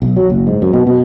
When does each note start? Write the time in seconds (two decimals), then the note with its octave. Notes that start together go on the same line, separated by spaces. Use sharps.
0.02 B1
0.16 F#3
0.30 F#1
0.47 G#2
0.62 F#2
0.73 B2
0.87 B2